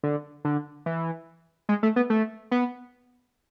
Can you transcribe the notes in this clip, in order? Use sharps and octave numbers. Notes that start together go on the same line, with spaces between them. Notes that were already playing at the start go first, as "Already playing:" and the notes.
D3
D3
E3
G#3
A3
B3
A3
B3